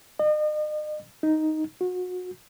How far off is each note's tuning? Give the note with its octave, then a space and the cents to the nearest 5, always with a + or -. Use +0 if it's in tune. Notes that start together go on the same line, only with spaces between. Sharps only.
D#5 -40
D#4 +5
F#4 -30